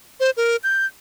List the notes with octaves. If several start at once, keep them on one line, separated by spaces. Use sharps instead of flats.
C5
A#4
G6